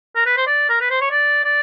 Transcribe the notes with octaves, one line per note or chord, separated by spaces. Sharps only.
A#4
B4
C5
D5
A#4
B4
C5
C#5
D5
D5